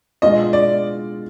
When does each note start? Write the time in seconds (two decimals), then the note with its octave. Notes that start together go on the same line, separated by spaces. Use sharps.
0.22 B2 G#3 B3 D4 F4 D#5
0.53 D5